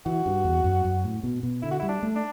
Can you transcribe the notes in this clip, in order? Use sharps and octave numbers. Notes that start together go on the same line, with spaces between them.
E3 F#4
G2
E2
F#2
F#2
A2
B2
B2
D3 E4
F#4
E4
G3
D4
A3
D4